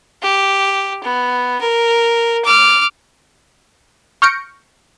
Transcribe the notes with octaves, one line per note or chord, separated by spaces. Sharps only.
G4
B3
A#4
D6 F6
C#6 F6 G6 A#6 C#7 D7